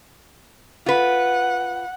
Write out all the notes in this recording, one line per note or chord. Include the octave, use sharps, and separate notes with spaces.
F4 B4 F#5